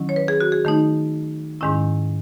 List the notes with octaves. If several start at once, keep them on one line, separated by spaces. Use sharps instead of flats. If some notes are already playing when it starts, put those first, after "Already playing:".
Already playing: D#3 F#3 C#4 E4
C#5
B4
G#4
F#4
G#4
D#3 A3 D#4
G#2 D#3 G#3 C#4 E4